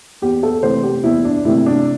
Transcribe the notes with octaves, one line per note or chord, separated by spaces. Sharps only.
E2 G4
A4
C3 E3 A3 C5
G4
E2 E4
D4
C3 E3 A3 E4
D4